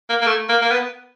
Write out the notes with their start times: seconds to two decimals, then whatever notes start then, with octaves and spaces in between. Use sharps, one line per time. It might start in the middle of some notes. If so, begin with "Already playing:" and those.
0.10 A#3
0.22 A#3
0.27 A3
0.49 A#3
0.62 A#3
0.72 B3